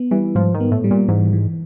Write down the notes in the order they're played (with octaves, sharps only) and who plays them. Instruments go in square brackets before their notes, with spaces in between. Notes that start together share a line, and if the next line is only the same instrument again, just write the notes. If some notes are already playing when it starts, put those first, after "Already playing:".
Already playing: [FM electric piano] B3
[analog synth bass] E3 [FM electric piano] G3
[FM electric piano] G#2 [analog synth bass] F3
[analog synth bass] D#3
[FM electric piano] B3
[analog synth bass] A2
[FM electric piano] G3
[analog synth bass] A#2
[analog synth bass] G#2 [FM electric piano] E3
[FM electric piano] E3